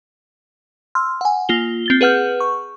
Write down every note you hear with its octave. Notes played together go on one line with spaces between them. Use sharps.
C6 E6 F6
F#5 G#5
A#3 F4 G7
C4 A6 G7
G#4 B4 F#5 F6 G6
C#6